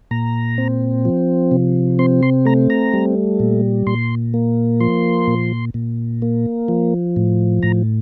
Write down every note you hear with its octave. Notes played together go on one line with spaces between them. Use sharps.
A#2 A#5
C4
F3
C3
C4 C6
C6
A3 A#5
A#5
G3
A#2
A#2 C6
A#3
F3 C6
A#2
A#2
A#3
F3
A2
A2 A#5